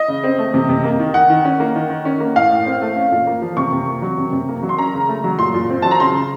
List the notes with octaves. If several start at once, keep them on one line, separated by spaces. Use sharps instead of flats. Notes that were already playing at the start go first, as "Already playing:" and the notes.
Already playing: D#5
C#3
C4
A3
C3
C3
A#3
D#3
D#3 F#5
D#3
C#4
A#3
D#3
D#3
C#4
A#3
A2 F5
A2
C4
A3
C#4
A#2
A#3
F3
C3 C#6
C3
A#3
F#3
C3
C3
A#3
F#3
C6
C#4 A#5
C#3
A3
F#3
A#2 C6
A#2
C4
F#3 A5
A#5
C#3 C6
C#3